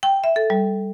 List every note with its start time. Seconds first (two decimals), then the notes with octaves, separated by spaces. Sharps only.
0.03 G5
0.24 E5
0.36 A4
0.50 G3